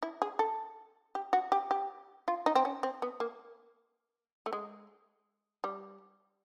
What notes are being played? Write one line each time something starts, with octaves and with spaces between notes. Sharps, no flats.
E4
G#4
A4
G4
F#4
G4
G4
F4
D#4
C4
C#4
C4
B3
A#3
A3
G#3
G3